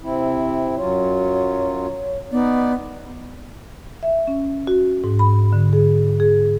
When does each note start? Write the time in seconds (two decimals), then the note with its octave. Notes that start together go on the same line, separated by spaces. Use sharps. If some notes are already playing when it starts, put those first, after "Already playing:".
0.01 C3 C4 E4
0.77 F#2 F#3 F4 C#5
2.32 B3 D#4 D5
4.03 E5
4.27 C#4
4.67 F#4
5.04 G#2
5.19 B5
5.53 D3
5.73 G#4
6.20 G#4